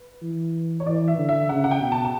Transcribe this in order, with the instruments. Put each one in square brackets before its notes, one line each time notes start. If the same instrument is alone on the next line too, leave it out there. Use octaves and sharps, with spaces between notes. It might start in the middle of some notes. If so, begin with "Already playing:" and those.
Already playing: [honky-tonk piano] B4
[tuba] E3
[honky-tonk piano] C#5
[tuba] E3 [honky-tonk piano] D5
[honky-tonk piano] E5
[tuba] D3
[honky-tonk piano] E5
[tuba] C#3 [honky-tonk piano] F#5
[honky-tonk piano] F#5
G5
[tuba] B2
[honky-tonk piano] A5
A5